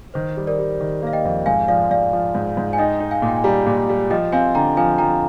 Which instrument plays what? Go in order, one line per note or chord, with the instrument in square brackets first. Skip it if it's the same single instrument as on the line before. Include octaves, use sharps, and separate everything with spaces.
[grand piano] D#3 [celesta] C5
[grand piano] G3
[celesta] A#4 D5
[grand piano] G3
D#3
[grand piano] A#3 [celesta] F5
[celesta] D#5 G5
[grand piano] F2
[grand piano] G#2 [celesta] F5 G#5
[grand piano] F3 [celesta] D5 F5
[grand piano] G#2 [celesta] D5 F5
[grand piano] F3
G#2
G#2
[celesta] G#5
[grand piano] D#4 [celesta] D#5 G5
[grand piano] D#4
[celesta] F5 G#5
[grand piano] A#2
[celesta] G5
G#5
[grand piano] G3 [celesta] G5 A#5
[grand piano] A#2
G3
[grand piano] F3 [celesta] D#5 G5
[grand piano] C4 [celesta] F5 G#5
[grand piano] D3 [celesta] G5 A#5
[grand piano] F3 [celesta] F5 G#5
[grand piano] F3 [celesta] G5 A#5